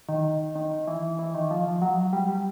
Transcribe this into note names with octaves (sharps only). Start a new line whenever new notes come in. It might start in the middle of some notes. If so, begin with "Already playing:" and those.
D#3
D#3
E3
E3
D#3
F3
F#3
G3
G3